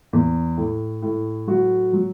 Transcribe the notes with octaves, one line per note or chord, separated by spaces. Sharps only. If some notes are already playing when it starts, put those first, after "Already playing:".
E2
A2
A2
F#3 F#4
F#3